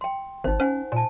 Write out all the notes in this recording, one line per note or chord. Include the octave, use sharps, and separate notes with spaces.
G5 C6
G#1 D#4 C5
C#4 C5 F#5 G#5
A#2 G#5 A5